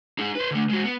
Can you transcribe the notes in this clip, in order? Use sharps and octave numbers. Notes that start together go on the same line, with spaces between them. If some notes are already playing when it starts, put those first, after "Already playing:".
D#4 G#4
B4 C5
D3 A3
G#3 F#4
B3